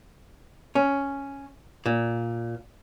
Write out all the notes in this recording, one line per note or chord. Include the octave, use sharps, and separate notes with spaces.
C#4
A#2